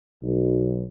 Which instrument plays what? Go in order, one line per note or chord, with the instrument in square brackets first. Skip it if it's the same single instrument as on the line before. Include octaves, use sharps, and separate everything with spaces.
[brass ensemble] B1